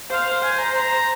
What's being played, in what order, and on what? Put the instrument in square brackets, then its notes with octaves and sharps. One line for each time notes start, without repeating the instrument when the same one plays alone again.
[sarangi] C5 [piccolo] F5
[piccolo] G#5
A#5
A#5